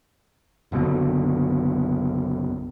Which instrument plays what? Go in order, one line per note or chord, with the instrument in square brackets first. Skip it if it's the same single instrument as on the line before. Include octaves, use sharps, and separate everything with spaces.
[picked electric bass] F#1 B1 B2 D3